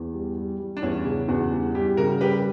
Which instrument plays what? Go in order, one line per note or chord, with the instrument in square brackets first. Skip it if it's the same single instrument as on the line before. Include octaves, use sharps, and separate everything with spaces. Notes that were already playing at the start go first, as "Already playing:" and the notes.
Already playing: [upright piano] E2
G3
G3
G3
[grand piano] D4
[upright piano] E2 [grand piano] C#4 E4
[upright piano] C#3
[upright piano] E2 [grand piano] D4 F#4
[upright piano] G3
[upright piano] G3 [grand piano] E4 G4
[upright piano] C#3 [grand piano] F#4 A#4
[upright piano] G3 [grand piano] G4 B4